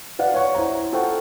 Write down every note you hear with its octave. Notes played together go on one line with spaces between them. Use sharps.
B4 D5 F5 F#5
C#5 F#5 C#6
E4 C5 A#5
F4 A4 C5 F#5 G5 C#6